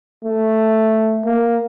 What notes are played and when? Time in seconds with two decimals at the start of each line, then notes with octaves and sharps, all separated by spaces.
0.24 A3
1.25 A#3